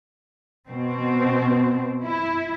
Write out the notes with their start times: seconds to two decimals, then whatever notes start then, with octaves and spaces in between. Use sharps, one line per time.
0.68 B2 C4
2.04 E4